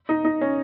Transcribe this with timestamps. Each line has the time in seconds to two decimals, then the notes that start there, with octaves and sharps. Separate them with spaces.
0.09 D#4
0.25 D#4
0.41 C#4